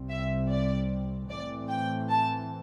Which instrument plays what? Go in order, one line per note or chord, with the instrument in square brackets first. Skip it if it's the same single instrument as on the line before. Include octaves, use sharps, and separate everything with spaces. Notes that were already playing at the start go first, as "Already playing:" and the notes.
Already playing: [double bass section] C2 C3 G3 C4
[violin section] E5
D5
[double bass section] A2 E3 A3 C4 [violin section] D5
[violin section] G5
A5